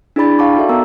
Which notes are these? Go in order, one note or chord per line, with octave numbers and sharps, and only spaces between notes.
D4 E4 G#4 D5 B5 A6
F5 G5 A5 C#6 D6
D#4 F#4 A4 D5 E5
B3 A#4 E5 A#5 E6